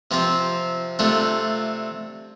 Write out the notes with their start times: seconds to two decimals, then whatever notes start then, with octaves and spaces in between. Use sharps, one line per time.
0.11 C3 F3 C4 F4
0.99 C3 A3 D4 F4